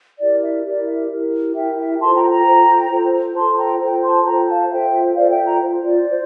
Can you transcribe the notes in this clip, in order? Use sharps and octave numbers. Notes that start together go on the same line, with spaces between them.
E4 G4 A#4 D5
E5
E4 G4 A#4 D5
E5
E4 G4 A#4
E4 G4 A#4 E5 G5
E5 G5
F4 A4 C5 A5 C6
G5 A#5
G5 A#5
F4 A4 C5
F4 A4 C5
F4 A4 C5 A5 C6
G5 A#5
F4 A4 C5 G5 A#5
A5 C6
F4 A4 C5 G5 A#5
F5 A5
F4 A4 C5 E5 G5
F4 A4 C5 D5 F5
E5 G5
G5 A#5
F4 C5
D5
F4 C5